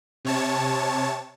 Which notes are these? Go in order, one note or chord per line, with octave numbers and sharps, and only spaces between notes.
C3 C#5 A5